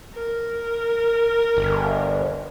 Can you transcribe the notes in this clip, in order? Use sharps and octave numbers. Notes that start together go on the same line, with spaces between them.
A#4
G1